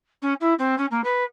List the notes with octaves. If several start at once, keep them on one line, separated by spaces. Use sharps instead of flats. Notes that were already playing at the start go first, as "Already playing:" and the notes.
C#4
E4
C4
C#4
A#3
B4